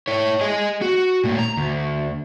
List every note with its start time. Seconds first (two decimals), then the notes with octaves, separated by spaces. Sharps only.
0.08 E4 C#5
0.41 G#4 D#5
0.82 F#4
1.24 A#2 A3
1.39 A#5
1.57 D2